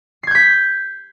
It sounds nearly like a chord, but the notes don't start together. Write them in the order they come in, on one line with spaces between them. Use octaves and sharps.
C7 G#6 G6 B6